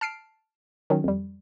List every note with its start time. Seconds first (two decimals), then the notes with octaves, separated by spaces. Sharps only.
0.01 A5 F6 C7 D7
0.90 D#3 F#3 C#4
1.04 F2 G3